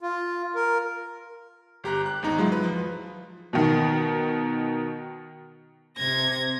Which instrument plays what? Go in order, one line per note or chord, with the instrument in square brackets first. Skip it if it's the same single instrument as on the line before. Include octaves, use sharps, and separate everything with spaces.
[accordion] F4
A#4
[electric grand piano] G1 G4 A#5 F#6
F#6
G#1 E2 D#4 A#5
F#3 G#3 E4 F4
B4
F3
[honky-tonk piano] B2 D#3
[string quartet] C3 G#6 A#6